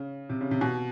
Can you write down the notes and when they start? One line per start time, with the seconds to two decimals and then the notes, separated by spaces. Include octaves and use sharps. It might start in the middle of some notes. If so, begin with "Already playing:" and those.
Already playing: C#3
0.29 C3
0.41 C#3
0.51 C3
0.61 B2